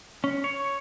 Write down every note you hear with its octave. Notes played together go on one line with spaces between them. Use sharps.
C#4
C#5